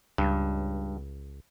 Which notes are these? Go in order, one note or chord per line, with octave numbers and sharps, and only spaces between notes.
C#2 G2